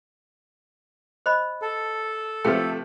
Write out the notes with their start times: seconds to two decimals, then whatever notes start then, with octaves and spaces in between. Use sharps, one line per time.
1.26 C5 D#5 B5
1.62 A4
2.45 C3 F3 A3 B4 G5